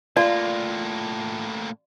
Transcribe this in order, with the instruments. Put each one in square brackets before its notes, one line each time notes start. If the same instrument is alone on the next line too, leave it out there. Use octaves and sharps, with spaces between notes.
[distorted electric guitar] A2 A#3 [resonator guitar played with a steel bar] F4 [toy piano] D5